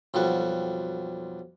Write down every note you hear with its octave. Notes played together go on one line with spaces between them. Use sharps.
B1 F2 G3 F#4